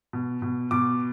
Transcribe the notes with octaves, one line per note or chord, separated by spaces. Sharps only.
B2
B2
B2 D6